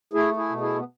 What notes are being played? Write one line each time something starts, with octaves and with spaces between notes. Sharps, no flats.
A3 E4 G#4
E4 G#4
B2
E4 G#4
B3